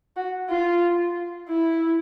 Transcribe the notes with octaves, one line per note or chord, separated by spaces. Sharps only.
F#4
F4
E4